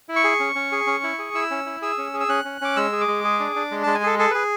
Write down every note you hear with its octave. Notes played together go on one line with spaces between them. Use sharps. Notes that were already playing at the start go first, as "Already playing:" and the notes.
E4
C#6
G#4
C#4
C#4
G#4
C#4
E4
G#4
E4 E6
C#4
E4
G#4 E6
C#4
G#4
E6
C#4 F#6
C#4
C#4 D6
G#3 E6
G#4
D6
G#3
G#4
D4
D4
G#3
G#3 A5
G#5
G#4 A4
G#4 A4
G#4 B4